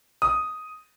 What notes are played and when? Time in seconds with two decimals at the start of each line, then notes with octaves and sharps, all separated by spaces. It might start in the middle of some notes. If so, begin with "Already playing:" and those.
0.22 D#6